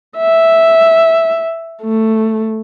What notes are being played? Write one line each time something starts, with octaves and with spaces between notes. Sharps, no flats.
E5
A3